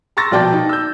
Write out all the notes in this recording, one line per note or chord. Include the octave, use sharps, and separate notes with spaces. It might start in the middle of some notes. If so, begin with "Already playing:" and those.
A#5 C6 C#6 E6 A6 A#6
A#1 B2 D5 G5 A5 G6
D#4
E6 G6